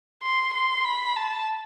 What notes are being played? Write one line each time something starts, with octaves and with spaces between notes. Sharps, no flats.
C6
C6
B5
A5